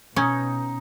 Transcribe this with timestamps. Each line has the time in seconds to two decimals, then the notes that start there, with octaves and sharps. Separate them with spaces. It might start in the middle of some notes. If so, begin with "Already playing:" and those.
0.16 B2 C#4 D#4